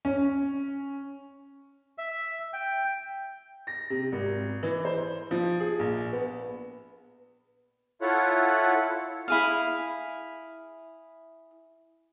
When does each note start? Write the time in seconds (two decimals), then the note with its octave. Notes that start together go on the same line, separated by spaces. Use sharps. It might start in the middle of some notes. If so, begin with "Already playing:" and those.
0.05 C#4
1.98 E5
2.53 G5
3.67 A#6
3.90 C3
4.12 G#1
4.63 E3
4.85 C5
5.31 F3
5.60 G#4
5.79 A#1
6.13 B3
8.02 E4 F4 A4 C#5 F#5
9.28 E4 G#4 F5